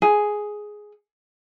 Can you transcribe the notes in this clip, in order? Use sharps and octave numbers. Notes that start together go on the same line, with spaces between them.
G#4